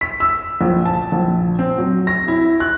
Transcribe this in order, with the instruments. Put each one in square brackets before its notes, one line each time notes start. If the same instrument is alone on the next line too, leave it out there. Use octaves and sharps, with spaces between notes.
[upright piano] B6
E6
A#1
A5
A#1
C4
F#3
A#6
E4
F#6